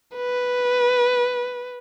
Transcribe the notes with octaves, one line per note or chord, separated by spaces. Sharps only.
B4